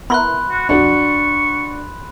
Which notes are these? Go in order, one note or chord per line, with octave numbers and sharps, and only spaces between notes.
B3 E4 A#4 B5 C6 F#6
F#4
B1 F2 D4 F#4 C#6